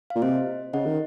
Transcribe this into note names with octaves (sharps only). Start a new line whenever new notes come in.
A#2 F5
C3 C5 D#5
C#3 D#5 F#5
D#3